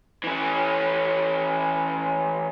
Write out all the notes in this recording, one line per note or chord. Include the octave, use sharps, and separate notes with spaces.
E3 C#4